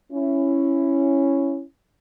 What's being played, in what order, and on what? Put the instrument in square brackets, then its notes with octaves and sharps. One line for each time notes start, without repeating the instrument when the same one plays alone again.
[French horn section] C#4 E4